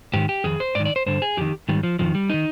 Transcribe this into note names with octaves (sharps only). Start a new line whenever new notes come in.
G#2 D#3 G4
G4
F2 D#3 G#4
C5
G#2 D#3 D5
D5
C5
G2 D3 C5
G#4
F2 D#3 G4
G#2 D#3 G3
F3
F2 C3 D#3 F3
G3
D#3 D#4